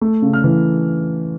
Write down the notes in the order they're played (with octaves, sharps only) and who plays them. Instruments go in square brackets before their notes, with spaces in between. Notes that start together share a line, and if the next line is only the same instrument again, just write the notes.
[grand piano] A3
C#3
F6
E3